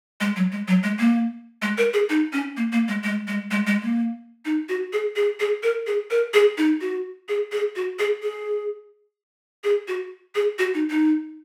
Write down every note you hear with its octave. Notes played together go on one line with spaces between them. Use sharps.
G#3
F#3
G#3
F#3
G#3
A#3
G#3
A#4
G#4
D#4
C#4
A#3
A#3
G#3
G#3
G#3
G#3
G#3
A#3
D#4
F#4
G#4
G#4
G#4
A#4
G#4
A#4
G#4
D#4
F#4
G#4
G#4
F#4
G#4
G#4
G#4
F#4
G#4
F#4
D#4
D#4